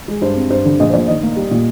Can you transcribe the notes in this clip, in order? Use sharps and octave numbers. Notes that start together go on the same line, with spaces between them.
G#3
G2 C5
C4
G2 C5
D3
A#1 D#5
C5
A#2 D5
D#3 D#5
A#3
G3
A#2